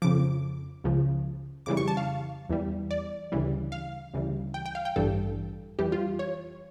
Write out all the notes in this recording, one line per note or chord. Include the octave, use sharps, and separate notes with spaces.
F2 C#3 F3 D6
C#2 C#3 F3
F2 C#3 E3 G3 D6
C#6
A5
F5
E2 E3 G3
D5
D2 C#3 E3 G3
F5
D2 C#3 E3 G3
G5
G5
F5
G5
A1 G2 E3 G3 A4
F2 E3 G3 G4
F4
C#5